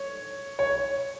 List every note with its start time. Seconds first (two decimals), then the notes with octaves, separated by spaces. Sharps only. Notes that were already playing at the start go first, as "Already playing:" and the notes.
Already playing: C#5
0.59 C#5